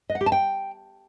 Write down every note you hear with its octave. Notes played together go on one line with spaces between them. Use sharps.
D#5
F#5
G4
A5
G5